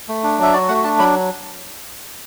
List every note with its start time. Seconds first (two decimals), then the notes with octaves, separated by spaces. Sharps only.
0.08 A3
0.23 D4
0.38 F#3 E5
0.53 F#4 D5
0.68 A3 F#5
0.84 D4 A5
0.99 F#3 B5